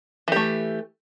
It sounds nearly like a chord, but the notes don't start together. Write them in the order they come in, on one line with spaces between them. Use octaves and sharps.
E3 G4 A3